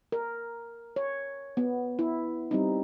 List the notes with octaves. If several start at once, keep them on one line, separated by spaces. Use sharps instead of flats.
A#4
C#5
B3
E4
G3 C4 D#4